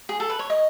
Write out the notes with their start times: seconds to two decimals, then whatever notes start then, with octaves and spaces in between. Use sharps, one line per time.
0.09 G#4
0.20 A4
0.30 B4
0.39 C#5
0.50 D#5